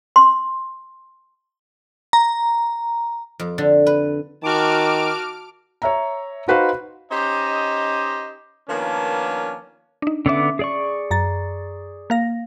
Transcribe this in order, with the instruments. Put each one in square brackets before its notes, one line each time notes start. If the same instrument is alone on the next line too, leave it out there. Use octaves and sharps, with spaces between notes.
[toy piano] C6
[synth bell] A#5
[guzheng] F2
D3
B4
[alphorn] D#3 [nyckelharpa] F#4 A5 [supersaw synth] D6 F6 D7
[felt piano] C#5 E5 A#5
D#4 F#4 B4 C5 F5
[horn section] C#4 D#4 G4 C5 D#5
D#3 F3 A#3 B3 C#4 D4
[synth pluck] D4 D#4
[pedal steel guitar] D3 B3 D6 [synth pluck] C#4 E5
[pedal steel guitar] G#4 D5 C#6
[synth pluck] F#2 A#5 A6
A#3 F5 A#6